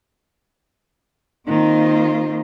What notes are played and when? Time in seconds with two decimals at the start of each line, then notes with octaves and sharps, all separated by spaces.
1.47 D#3 A#3 C4 D#4 F4 C5